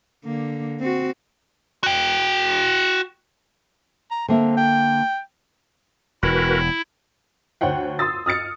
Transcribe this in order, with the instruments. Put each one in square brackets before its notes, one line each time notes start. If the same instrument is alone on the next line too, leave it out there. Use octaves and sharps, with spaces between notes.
[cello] D3 A#3
C4 F#4
[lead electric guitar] F#4 G5
[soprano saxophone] A#5
[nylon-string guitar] D3 A#3 E5 [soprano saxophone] C4
[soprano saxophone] G5
[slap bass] E1 [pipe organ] E4 [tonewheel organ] F#4 A#4 B4
[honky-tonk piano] D2 C5 C#5 F#5 G5
C6 D#6 E6 A6
D#6 F6 A6 C#7